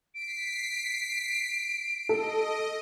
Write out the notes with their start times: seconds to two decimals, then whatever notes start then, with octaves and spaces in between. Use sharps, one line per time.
0.14 B6 C7 D7
2.09 A4 D#5